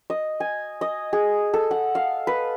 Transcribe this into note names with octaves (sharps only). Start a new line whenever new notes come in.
D#5
G#5
D#5
G#4
A4
F#5
F5
B4